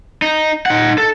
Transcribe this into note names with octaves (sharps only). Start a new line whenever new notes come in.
D#4
D#4 F#5
A4